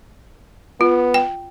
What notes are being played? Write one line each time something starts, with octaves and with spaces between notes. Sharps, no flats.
B3 F4
G5